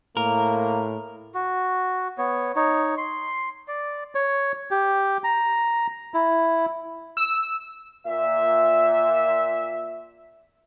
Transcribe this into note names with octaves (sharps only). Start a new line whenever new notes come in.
A2 A#3 A#4
F#4
B3 C#5
D#4 C#5
C6
D5
C#5
G4
A#5
E4
E6
A#2 E5